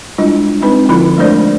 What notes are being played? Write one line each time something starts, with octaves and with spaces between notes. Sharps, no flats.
G3 G#3 D4 E4 F4
G#3 C4 D#4 B4
D3 F3 E4 F4 B5
G#3 A3 D4 A#4 C5 D5